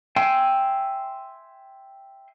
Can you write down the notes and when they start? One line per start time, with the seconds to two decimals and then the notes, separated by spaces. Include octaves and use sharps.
0.16 E5 G5 G#5 C6